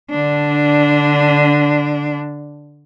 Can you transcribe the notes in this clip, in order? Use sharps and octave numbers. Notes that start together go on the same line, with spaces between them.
D3 D4